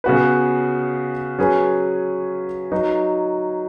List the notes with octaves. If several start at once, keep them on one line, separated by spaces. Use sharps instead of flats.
C#3 B3 F#4 B4
F#3 C#4 G#4 B4
F#3 D#4 B4